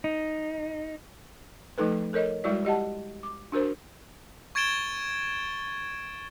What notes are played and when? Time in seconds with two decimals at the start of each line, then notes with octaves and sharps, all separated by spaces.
0.04 D#4
1.78 F3 A3 D#4 A4 B4
2.13 A4 A#4 C#5 D#5
2.44 G3 G#3 E4 F#4 D5
2.65 G4 D#5 F#5 A5
3.23 D6
3.52 D4 F#4 A#4 C5
4.55 C#6 G#6 A6 D7 E7 G7